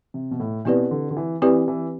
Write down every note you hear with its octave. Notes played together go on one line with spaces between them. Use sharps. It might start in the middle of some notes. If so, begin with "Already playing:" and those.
C3
B2
A2
B2 C4 E4 G4 B4 D5
D3
D3
E3
E3 C4 E4 G4 B4 D5
E3